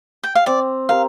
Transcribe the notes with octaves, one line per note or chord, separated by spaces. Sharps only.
G5
F5
C4 D5
G4 A#4 F5